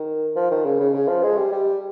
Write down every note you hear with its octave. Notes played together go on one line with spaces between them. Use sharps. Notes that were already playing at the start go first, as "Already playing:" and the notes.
Already playing: D#3
F3
D#3
C#3
C#3
C#3
F3
G#3
G3
G3